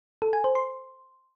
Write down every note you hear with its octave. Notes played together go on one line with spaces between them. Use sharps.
A4
G#5
C5
C6